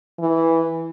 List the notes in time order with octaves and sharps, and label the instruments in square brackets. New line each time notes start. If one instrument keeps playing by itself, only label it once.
[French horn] E3